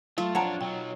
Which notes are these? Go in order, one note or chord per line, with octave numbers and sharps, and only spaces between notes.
F#3 A3 F4
F2 D4 C#5 F#5 A5 A#5
B1 F#3 G5